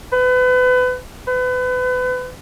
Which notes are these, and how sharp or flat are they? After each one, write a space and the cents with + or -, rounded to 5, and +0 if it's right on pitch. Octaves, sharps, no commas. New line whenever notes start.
B4 +30
B4 +30